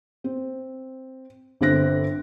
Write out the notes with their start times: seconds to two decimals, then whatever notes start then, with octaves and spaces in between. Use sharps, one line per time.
0.24 C4
1.61 G1 D3 C4 F#6 A#6